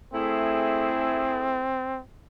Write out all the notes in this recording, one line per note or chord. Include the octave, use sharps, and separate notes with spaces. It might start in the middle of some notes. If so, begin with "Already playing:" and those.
A3 C4 E4 G#4